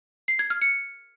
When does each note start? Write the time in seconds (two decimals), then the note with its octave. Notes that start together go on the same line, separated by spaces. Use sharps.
0.28 C7
0.39 G#6
0.50 F6
0.62 C#7